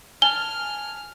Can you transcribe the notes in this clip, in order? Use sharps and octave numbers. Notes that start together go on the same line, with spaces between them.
G#5 A5 F6 G7